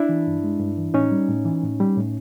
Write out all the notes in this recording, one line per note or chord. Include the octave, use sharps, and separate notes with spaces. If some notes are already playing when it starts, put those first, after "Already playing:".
Already playing: D4 E4
E3
G2
G#3
G2
E3
A2 C#4 D#4
G3
A2
E3
A2
G3
A2